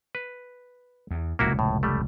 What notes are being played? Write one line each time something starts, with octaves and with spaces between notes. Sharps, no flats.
B4
E2
F1 C#2 A#2 A#3 E4 F#4
A2
G3 A3